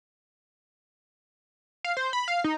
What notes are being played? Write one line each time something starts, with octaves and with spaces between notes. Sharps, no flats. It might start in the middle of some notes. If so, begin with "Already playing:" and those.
F5
C5
B5
F5
D#4